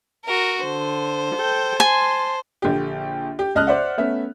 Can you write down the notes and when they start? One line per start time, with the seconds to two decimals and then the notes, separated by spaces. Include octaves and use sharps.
0.25 F#4 A#4
0.63 D3 C5
1.35 A4 G5
1.80 G#5 A5 C6
2.62 A#1 D3 G4
3.39 G4
3.55 C#2 D#5 A5 F6 F#6
3.67 C5 D5 E5 F#5
3.98 A3 B3 C#4 E5